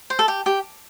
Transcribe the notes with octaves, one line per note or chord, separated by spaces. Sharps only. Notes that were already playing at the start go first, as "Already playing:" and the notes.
C5
A4
G4
G4